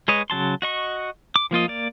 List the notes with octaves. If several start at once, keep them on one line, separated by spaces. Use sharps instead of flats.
G#3 B4 C#5 D#5
C#3 F#3 A5 C6
F#4 D#5 C#6
D6
F3 A#3 F4 D#5
A#3 D5